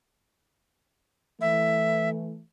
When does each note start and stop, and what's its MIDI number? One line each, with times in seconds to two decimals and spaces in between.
1.41 2.41 52
1.41 2.41 57
1.41 2.09 76